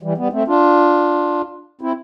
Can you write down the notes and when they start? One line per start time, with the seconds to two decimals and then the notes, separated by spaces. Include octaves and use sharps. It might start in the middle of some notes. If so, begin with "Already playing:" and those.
0.03 E3 G3
0.18 G3 B3
0.33 A3 C4
0.48 D4 F4
1.81 C4 E4